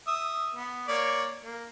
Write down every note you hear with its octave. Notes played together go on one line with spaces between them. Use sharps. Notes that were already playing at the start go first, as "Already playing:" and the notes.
E5 D#6
B3
A#3 C#5 D5
A#3